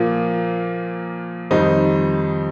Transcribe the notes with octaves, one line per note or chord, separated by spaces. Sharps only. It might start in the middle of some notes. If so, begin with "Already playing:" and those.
Already playing: A#2 F3 A#3
F2 D#3 G3 C4 D#4